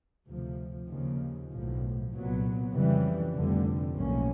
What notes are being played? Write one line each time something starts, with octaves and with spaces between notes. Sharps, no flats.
D2 C3 F3
D#2 C#3 F3
B1 A2 F3
C2 A#2 F#3 B3
F2 C#3 E3 G3
F1 F2 D3 G3
B1 A2 F3 A#3 C#4